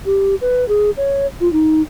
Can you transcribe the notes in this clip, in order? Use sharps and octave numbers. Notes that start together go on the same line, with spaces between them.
G4
B4
G#4
C#5
F4
D#4